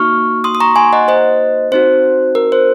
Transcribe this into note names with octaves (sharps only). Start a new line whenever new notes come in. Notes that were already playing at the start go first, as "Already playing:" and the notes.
Already playing: A#3 D#4 F#4 C#6 F6
C6 D#6
D#6
A#5 C#6
G#5 C6
D#5 F#5
C5 D#5
C4 D#4 F#4 C5
A#4
C5